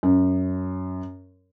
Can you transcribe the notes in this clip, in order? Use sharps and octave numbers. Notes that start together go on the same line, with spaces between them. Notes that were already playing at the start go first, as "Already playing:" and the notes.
F#2